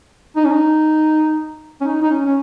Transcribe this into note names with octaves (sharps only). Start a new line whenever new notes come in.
D#4
C#4
D#4
C#4
D#4
D#4
C#4
C#4